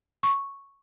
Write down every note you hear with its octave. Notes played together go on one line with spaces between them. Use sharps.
C#6